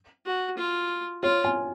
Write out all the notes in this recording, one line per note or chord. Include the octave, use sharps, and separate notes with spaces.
F#4
F4
F4 C#5
G#5